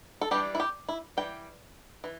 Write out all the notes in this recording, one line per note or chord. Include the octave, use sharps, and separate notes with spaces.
A4
E3 G3 D4 G4
E4
G4
E4
E3 G3 G5
E3